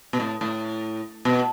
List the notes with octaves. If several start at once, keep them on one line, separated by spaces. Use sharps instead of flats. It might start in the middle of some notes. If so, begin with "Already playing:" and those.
B2
A2
A2
B2